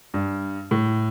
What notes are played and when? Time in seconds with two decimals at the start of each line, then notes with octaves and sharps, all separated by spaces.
0.14 G2
0.71 A2